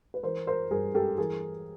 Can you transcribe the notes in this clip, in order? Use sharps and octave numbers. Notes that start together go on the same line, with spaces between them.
B4
E3 A#4 C5
A#4 C5
G2 G#4 A#4
G4 A4
E3 G#4 A#4